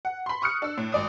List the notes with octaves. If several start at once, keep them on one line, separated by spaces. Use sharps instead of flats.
F#5
B5 C6
C#6 D#6 F6 F#6 C#7
D4 E6
A2
G#1 D5 D#6